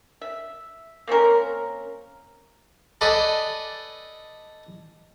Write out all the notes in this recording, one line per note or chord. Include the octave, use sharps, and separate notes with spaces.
E5
A#3 C4 C#4 A#4
A4 B4 D5 D#5 G#5 A5